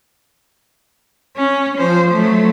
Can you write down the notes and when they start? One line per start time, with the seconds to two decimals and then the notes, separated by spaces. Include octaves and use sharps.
1.36 C#4
1.78 F3 C5
2.12 F#3 A3